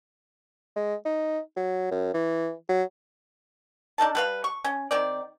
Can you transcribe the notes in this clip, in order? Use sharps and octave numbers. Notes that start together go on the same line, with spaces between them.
G#3
D#4
F#3
F#2
E3
F#3
D4 D#4 A4 A5
G3 B4 F5
C#6
C#4
D#3 C4 D5